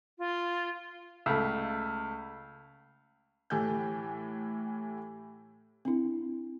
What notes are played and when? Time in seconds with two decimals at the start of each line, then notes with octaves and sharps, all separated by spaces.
0.18 F4
1.26 C#2 A3
3.50 A2 E3 G4 A4 G#5 G6
5.85 C4 D4 E4